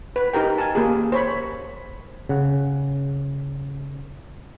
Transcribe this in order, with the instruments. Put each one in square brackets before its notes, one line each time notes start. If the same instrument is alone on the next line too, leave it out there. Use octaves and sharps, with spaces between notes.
[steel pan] B4
D#4 G4 A#4 G5
G#5 A5
A#3 G4 G#4
C5 C#5 B5
[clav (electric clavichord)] C#3 F#5